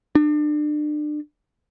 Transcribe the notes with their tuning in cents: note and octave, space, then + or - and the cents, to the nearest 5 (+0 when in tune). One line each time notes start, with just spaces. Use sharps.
D4 +35